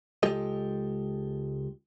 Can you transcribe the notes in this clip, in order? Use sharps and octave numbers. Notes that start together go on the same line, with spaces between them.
C#2 G#3 F4 G4 A4 D#5